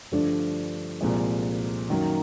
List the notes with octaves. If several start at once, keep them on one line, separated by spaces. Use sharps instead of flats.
G2 D3 F3 A3 D4
C2 A#2 F3 G#3
F#2 D#3 F#3 A#3